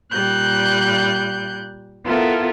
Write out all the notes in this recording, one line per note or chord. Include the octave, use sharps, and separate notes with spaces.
A#2 G3 F#6 G6
B3 E4 F4 A4 A#4